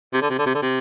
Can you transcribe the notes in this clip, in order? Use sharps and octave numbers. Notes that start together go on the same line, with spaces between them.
C3
D3
C3
D3
C3
D3
C3